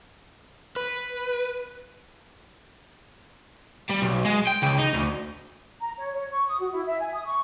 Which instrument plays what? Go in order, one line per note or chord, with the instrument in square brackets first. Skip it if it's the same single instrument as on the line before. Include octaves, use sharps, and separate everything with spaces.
[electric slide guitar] B4
[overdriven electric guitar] G3
B1
G#3
G5
C#2
D#4
D2
[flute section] A#5
C#5
C#5
C#6
D#6
F#4
E4
E5
G#5
D#6
C#6